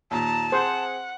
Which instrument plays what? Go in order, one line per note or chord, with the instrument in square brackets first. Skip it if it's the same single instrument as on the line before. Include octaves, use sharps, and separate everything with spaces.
[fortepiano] D#2 A#2 [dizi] A5 [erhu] A#5
[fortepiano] C4 G#4 [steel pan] C5 [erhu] F#5